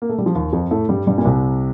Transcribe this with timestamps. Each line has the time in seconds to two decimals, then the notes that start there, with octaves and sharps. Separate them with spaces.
0.02 A#3
0.09 A3
0.18 G3
0.26 F3
0.35 D#2 D#3
0.53 F2 F3
0.71 A2 A3
0.89 G2 G3
1.07 G2 G3
1.18 A#2
1.25 C2 C3